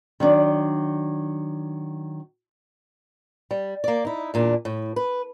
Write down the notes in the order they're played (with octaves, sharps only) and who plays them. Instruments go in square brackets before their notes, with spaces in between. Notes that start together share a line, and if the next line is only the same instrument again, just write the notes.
[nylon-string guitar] D#3 F#3 D4
[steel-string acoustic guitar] G3
A#3 D5
D#4 E4
E2 A#2 D4
A2
B4